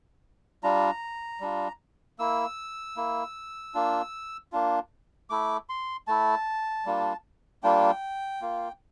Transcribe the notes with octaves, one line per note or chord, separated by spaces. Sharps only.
G3 D4 F4 A#5
G3 D4 F4
A#3 E4 E6
A#3 E4
A#3 D4 F4
A#3 D4 F4
A3 E4 D6
C6
A3 E4 A5
G3 A#3 D4 F4
G3 A#3 D4 F4 G5
A#3 F4